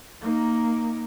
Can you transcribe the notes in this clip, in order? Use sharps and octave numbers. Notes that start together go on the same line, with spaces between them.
A#3 D#4